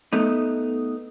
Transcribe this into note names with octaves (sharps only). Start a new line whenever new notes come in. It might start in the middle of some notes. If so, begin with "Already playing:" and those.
A3 B3 D#4